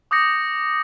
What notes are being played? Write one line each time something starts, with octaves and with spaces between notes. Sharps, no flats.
D6 D#6 G6 A#6 C#7